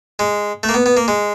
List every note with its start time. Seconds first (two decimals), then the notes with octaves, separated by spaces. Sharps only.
0.19 G#3
0.63 A3
0.69 A#3
0.74 B3
0.86 B3
0.97 A#3
1.08 G#3